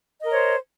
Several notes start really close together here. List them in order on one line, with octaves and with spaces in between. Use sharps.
D#5 A#4 C#5 C5